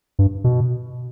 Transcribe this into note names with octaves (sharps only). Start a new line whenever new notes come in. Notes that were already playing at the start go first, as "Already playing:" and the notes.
G2
B2